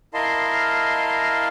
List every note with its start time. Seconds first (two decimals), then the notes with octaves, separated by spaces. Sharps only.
0.14 E4 A#4 D#5 F5 A5 C6